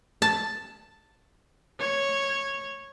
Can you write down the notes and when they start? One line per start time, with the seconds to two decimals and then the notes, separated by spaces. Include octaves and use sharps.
0.22 A5
1.79 C#5